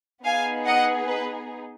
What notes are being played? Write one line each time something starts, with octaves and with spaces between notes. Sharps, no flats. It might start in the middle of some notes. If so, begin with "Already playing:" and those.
B3 D#4 G#4 F5 G#5
D#5 F#5
B4